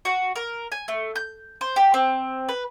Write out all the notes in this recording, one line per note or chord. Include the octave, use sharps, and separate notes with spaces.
F#4
A#4
G#5
A3
G6
C5
G4
C4
B4